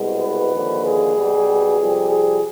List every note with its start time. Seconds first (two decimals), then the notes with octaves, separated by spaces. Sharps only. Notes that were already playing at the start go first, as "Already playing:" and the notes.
Already playing: C2 B2 G#3
0.21 B4
0.52 D#2 D3 F3
0.84 G#4
1.14 B1 B2 G3
1.77 F2 C3 G3
2.08 G#4